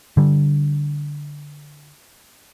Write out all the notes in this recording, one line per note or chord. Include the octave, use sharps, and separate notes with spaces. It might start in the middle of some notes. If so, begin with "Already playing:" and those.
D3 G3